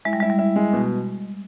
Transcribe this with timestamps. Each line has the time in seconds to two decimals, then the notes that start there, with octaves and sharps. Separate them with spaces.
0.05 G#3 E4
0.13 G3
0.20 G#3 E4
0.30 G3
0.39 E4
0.56 G#3
0.73 B2